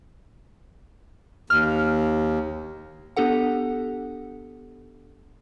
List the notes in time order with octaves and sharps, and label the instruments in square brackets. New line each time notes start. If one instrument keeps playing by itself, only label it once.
[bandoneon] D#2 [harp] F6
[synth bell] B3 D4 G4 A4 F#5